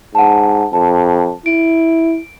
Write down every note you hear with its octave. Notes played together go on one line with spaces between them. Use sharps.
G#2 F#5 A5
F2 A5
E4 D7